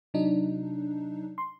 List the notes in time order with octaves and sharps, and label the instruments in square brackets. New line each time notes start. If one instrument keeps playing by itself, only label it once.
[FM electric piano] C3 F#3 D4 D#4
C6